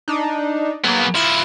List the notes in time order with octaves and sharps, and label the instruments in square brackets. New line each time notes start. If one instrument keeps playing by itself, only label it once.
[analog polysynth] D4 D#4
[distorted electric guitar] F#3 B3 [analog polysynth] A#3 G#4
[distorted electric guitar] F3 E4 [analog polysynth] F#6 G#6 A6